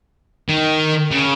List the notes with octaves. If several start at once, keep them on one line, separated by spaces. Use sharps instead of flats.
D#3
C#3